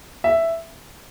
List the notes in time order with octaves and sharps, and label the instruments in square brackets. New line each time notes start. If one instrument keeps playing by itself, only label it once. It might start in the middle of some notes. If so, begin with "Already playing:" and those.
[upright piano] E5